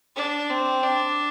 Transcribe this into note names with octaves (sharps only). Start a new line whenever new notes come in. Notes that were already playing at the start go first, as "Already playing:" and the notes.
D4
C4
D4